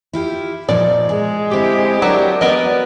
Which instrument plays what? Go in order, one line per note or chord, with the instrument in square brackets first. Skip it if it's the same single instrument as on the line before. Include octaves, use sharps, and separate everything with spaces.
[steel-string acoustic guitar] E4 F4 G4
[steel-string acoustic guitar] A#2 F3 D#4 [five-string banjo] D5
[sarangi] G#3 [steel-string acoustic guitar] G#4
[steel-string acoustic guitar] D3 C4 [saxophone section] E4 G4
[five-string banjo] F#3 [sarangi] D4 [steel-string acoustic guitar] A#4 C#5
[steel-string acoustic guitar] F#3 [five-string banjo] B3 A#4 D#5 [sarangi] D5